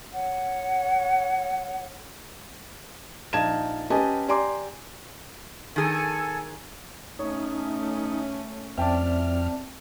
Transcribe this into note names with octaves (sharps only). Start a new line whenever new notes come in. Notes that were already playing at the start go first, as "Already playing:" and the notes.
C#5 F#5
A#1 D#4 F5 A5 G#6 E7
C#4 G4 B4 D#5 G#5 A5
G4 D5 G#5 A#5 C6 D6
D#3 G#4 A4 G#5
A3 C#4 D#4 C#5
F2 C4 D5 E5 G5 A5 F6